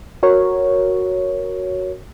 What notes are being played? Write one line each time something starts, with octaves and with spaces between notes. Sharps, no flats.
F#4 A#4 C#5